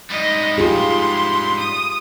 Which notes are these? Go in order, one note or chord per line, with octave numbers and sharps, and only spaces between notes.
G#2 G3 D#5
F4 G4 G#4 C6
D#6